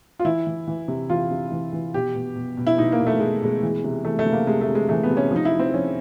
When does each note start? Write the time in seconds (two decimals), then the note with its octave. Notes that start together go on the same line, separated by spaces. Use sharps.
0.19 F4
0.25 E3 E4
0.47 E3
0.67 E3
0.88 C3
1.10 E3 F4
1.31 C3
1.52 E3
1.73 E3
1.94 B2 G4
2.15 B2
2.36 B2
2.57 B2
2.67 E4
2.78 B2 D#4
2.92 A#3
3.00 B2
3.07 A3
3.20 B2 G#3
3.42 B2 G#3
3.63 E3
3.84 C3
4.05 E3 A3
4.19 A3
4.26 C3
4.32 A#3
4.47 C3 G#3
4.61 A3
4.68 C3
4.75 G#3
4.89 E3 A3
5.03 B3
5.10 C3
5.17 C#4
5.31 F3 D#4
5.45 E4
5.52 F3
5.59 C4
5.74 F3 C#4